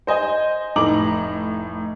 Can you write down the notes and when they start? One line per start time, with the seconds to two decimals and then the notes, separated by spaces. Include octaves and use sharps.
0.07 C5 D#5 G#5
0.76 F1 A2 D#4 A#5 D6 F#7